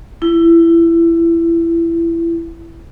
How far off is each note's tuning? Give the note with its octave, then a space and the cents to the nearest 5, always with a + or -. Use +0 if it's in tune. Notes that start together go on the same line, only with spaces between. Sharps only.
E4 +20